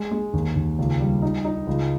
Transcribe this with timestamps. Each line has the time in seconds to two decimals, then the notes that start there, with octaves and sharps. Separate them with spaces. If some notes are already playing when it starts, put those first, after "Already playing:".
Already playing: G#3
0.11 G#3
0.33 D#2
0.56 D#2
0.79 C#2
1.00 G3
1.22 D#4
1.45 D#4
1.67 C#2